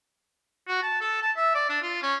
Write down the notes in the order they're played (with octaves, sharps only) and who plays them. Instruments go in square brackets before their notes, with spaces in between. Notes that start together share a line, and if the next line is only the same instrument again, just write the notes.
[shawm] F#4
A5
A4
A5
E5
D5
D4
F4
C#4